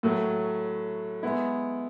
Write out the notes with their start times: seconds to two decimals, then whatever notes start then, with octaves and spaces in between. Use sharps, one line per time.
0.03 A2 F#3 A3
1.23 G#3 B3 E4